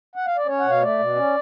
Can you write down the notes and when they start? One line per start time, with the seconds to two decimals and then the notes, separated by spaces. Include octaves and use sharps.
0.15 F#5
0.26 F5
0.37 D5
0.46 C#4 C#5
0.59 B2 F#5
0.70 F5
0.81 A3 D5
0.99 B2
1.15 C#4